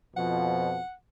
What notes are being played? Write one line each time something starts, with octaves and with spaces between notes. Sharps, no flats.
F2 B2 F3 F#5